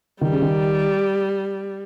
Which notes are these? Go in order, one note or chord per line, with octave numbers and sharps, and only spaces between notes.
D#3 G3
C#3
D#3